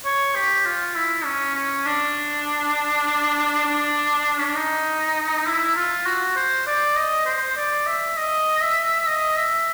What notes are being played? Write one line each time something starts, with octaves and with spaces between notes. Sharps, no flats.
C#5
G4
F4
E4
C#4
C#4
D4
D4
C#4
D4
D#4
E4
F4
F#4
C5
D5
D#5
C5
D5
E5
D#5
E5
D#5
E5